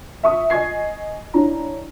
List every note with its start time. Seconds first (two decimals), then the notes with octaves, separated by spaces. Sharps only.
0.23 E5 C#6 D#6
0.50 D#5 G#5 C#6 G#6 C7
1.34 C#4 D4 E4 A#5